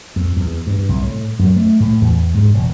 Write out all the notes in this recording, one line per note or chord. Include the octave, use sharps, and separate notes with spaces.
F2
E2
G2
C2
A2
F#2
A3
A2
E2
G#2
E1